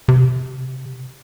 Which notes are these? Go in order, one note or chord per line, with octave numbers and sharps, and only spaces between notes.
C3